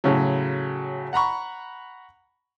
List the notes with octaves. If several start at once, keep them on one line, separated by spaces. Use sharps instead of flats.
A2 C#3 F#3
F#5 A#5 B5 C#6